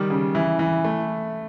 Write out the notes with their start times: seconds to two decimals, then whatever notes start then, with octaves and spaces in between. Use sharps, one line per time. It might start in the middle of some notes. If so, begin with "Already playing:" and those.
Already playing: D#3 G3
0.10 C#3
0.35 E3
0.59 E3
0.84 A3